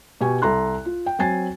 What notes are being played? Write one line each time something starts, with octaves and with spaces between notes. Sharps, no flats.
B2 G4 G#5 C#6
C2 A4 A#5 C6 F#6
F4
G5
F#3 C4 G#5 A6 C7